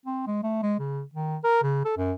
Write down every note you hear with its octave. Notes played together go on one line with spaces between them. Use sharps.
C4
G#3
A3
G#3
C#3
D#3
A#4
C#3
A4
F#2